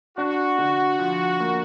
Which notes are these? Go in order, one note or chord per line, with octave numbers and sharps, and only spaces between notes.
D4 F#4
D3
F3
A#3